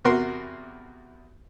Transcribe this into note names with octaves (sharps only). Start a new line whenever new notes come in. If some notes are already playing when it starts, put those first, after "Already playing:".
E2 C3 F#4 A#4 C6